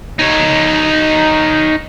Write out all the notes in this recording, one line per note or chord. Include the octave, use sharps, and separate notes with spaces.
D#4 C#5